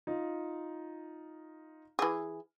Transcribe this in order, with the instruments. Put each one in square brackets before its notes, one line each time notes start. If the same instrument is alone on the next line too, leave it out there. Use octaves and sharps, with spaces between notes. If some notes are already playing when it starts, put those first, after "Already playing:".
[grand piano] D#4 F4
[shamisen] E3 G#4